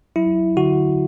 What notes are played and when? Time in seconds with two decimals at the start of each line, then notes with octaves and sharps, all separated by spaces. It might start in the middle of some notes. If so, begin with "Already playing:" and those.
0.16 F#3 E4
0.56 D3 F#4